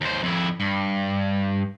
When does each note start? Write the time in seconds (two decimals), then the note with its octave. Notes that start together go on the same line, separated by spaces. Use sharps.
0.01 D#2 C5
0.23 F2 E4
0.60 G2